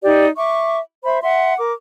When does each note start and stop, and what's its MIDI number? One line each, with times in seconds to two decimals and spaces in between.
0.02 0.26 63
0.02 0.26 67
0.02 0.26 74
0.36 0.77 76
0.36 0.77 85
0.36 0.77 86
1.03 1.19 72
1.03 1.19 76
1.03 1.19 83
1.22 1.53 76
1.22 1.53 78
1.22 1.53 84
1.58 1.72 70
1.58 1.72 86